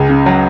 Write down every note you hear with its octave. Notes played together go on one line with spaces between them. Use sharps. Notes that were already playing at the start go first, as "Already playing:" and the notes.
Already playing: C#2 G#4
C#3
F#3